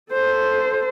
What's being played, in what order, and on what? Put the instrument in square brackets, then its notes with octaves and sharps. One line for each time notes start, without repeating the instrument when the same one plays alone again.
[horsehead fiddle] A4 C5